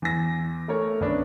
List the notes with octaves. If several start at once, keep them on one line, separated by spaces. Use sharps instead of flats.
E2 E3 A#6
A3 A#4 C#5
C2 F#2 D#3 B3 C#4 D4